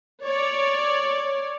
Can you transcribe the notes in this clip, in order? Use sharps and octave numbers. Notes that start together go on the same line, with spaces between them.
C#5 D5